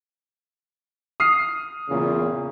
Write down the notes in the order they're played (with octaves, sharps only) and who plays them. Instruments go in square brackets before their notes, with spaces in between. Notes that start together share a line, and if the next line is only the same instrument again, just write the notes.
[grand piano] D#6 F6 C7
[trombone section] E2 A#2 C#3